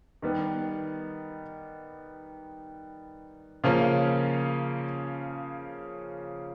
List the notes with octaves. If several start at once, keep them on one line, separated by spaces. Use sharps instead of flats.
D#3 G3 B3
C#3 F3 A#3 C#4